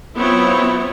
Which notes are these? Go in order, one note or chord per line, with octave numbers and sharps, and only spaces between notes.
F#3 B3 C4 E4 F4 C#5